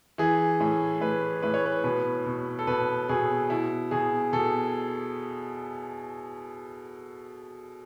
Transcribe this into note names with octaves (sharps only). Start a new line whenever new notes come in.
E3 G#4
A2
A2 B4
A2 B4
C#5
B4
B2 B4
B2
A4
B2 B4
B2 G#4
B2 E4
B2 G#4
B2 A4